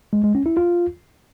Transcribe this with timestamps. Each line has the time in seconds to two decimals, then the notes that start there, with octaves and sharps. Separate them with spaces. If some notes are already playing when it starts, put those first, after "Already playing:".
0.13 G#3
0.24 G#3
0.35 C#4
0.46 E4
0.57 F4